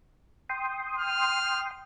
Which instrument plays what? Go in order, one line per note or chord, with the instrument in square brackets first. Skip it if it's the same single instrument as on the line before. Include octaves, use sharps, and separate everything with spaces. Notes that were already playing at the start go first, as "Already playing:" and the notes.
[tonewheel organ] G5 C6 D#6
[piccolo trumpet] F6